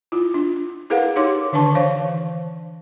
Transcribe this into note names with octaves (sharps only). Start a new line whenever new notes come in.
E4 F4
D4
E4 G#4 A#4 B4 F5 F#5
D#4 G4 C#5 C6 D6
D3 D#3 D4 B4 A5 C#6
E3 C5 C#5 F5